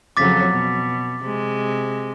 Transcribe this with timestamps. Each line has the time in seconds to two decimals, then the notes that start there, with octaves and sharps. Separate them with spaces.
0.17 F2 C#3 F#3 D6 A6 B6
0.49 B2
1.25 C3 G#3